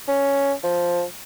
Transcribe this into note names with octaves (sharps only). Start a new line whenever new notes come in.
C#4
F3